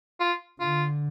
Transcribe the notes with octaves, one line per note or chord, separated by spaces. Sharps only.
F4
D3 F4